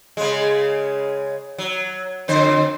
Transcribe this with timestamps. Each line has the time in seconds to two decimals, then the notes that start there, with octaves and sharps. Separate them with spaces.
0.17 C#3 G#3
1.58 F#3
2.28 F2 D3 C5